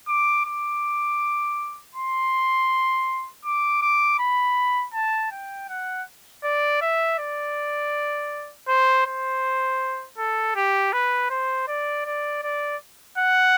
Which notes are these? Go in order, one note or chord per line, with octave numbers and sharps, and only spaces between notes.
D6
D6
C6
D6
D6
B5
A5
G5
F#5
D5
E5
D5
C5
C5
A4
G4
B4
C5
D5
D5
D5
F#5